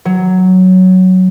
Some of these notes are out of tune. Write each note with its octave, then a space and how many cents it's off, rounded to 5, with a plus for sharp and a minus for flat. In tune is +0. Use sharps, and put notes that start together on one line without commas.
F#3 +5